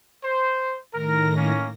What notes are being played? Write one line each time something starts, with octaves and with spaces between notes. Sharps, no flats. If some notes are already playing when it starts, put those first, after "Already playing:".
C5
A2 D#3 A#4 A#6
A#3 C#4